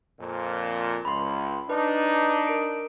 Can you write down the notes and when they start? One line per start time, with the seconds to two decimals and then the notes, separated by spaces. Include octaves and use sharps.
0.19 F2 A#2
1.05 C#2 B5 C6
1.69 D4 D#4 B4
2.47 A#4 D7